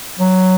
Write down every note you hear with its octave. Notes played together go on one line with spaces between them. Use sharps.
F#3